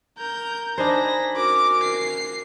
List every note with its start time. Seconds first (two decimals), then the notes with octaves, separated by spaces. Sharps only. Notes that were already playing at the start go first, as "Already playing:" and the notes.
0.18 A#4 G6
0.78 D4 D#4 C5 G#5 B5 A#6
1.36 C#4 F#4 A#4 D6
1.83 C7